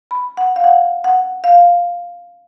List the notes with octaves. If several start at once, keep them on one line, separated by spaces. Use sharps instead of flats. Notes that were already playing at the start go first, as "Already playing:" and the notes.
B5
F#5
F5
F#5
F#5
F5